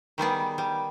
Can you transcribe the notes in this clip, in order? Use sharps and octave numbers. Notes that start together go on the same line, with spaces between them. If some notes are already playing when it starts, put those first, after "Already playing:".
D#3 G3 B3 G#4
G3